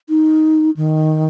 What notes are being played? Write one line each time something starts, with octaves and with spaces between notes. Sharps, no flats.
D#4
D#3